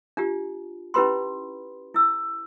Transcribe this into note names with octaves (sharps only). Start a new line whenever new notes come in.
D4 F4 G4
C#4 E4 G4 B4 B5 C6
E4 E6